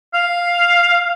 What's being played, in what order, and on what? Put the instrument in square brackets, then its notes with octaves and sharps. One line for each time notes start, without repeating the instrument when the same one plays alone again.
[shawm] F5